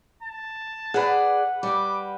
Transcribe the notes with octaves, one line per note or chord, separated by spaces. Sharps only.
A5
G#4 B4 D5 F#5
G3 D6